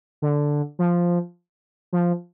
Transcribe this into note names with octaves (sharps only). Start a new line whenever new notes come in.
D3
F3
F3